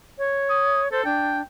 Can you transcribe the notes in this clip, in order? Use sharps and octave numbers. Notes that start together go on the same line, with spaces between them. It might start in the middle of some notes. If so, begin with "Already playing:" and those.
C#5
D#6
A4 C5
D4 G5